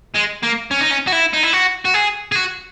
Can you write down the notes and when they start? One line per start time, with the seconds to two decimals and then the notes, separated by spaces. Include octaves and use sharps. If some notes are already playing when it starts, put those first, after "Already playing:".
0.16 G#3
0.43 A#3
0.71 C#4
0.81 D#4
0.91 C#4
1.07 F#4
1.12 E4
1.33 D#4
1.43 E4
1.53 F#4
1.85 F#4
1.94 G#4
2.32 G#4
2.35 F#4